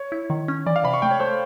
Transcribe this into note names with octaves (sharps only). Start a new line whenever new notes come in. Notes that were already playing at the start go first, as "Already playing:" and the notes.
Already playing: C#5
E4
D#3
C#4
E3 D5
F5
C3 B5
C#6
A3 G5
C#5
A3 C5